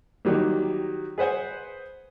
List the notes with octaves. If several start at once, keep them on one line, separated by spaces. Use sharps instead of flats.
D#3 F#3 G3 A#3
G#4 B4 C5 F#5 G#5